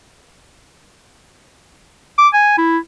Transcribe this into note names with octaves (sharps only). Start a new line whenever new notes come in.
D6
G#5
E4